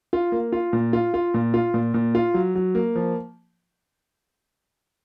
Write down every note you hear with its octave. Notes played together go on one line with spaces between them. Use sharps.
F4
A#3
F4
A#2
F4
F4
A#2
F4
A#2
A#2
F4
F#3
F#3
A#3
F3